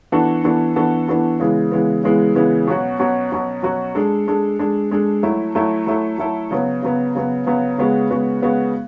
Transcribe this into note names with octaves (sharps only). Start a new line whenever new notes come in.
E3 B3 D4 F#4 A4
E3 B3 D4 F#4 A4
E3 B3 D4 F#4 A4
E3 B3 D4 F#4 A4
C#3 E3 G#3 B3
C#3 E3 G#3 B3
C#3 E3 G#3 B3
C#3 E3 G#3 B3
B2 F#3 C#4 F#4
B2 F#3 C#4 F#4
B2 F#3 C#4 F#4
B2 F#3 C#4 F#4
G#3 D4 A4
G#3 D4 A4
G#3 D4 A4
G#3 D4 A4
F#3 A3 E4 A4
F#3 A3 E4 A4
F#3 A3 E4 A4
F#3 A3 E4 A4
C#3 F#3 B3
C#3 F#3 B3
C#3 F#3 B3
C#3 F#3 B3
C#3 G#3 B3 F#4
C#3 G#3 B3 F#4
C#3 G#3 B3 F#4